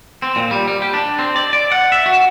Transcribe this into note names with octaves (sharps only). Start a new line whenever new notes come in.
C4
A#2
G3
G3
G4
D4
C4
D5
D5
F#5
E5
F#4